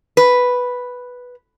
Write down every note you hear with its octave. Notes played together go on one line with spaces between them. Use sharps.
B4